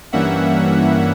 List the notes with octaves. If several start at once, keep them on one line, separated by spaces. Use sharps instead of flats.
G2 E3 G3 A#3 C#4 E5 F#5